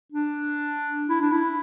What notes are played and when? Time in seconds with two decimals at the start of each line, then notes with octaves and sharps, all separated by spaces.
0.12 D4
1.09 E4
1.21 D4
1.32 E4